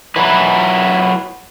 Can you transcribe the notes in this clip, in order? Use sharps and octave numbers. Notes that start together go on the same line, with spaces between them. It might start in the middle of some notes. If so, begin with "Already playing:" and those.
F#3 E4 B4